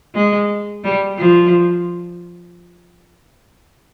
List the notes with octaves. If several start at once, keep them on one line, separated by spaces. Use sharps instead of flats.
G#3
G3
F3